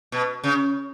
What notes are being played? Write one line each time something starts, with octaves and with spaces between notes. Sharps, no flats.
B2
C#3